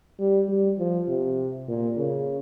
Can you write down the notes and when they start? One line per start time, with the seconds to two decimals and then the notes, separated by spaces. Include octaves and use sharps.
0.20 G3
0.49 G3
0.79 F3
1.08 C3
1.68 A#2
1.97 C#3